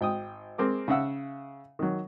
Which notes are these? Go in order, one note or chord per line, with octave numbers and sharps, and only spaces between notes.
G#1 G5 D#6
G#3 C4 A#4 D6
C#3 E5 F#5 E6
D#3 F#3